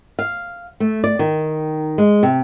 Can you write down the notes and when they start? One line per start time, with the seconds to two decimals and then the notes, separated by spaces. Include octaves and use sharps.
0.19 F5
0.80 A3
1.04 D5
1.19 D#3
1.98 G#3
2.23 C3